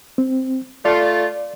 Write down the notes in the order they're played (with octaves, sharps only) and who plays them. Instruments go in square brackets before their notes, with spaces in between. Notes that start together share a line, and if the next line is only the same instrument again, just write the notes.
[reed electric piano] C4
[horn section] A3 F4 [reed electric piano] D5